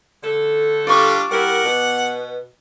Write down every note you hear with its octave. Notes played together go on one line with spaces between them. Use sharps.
D3 A3 A4
G3 D4 F4 D5 C#6
G3 E4 A#4 F#5
B2 B3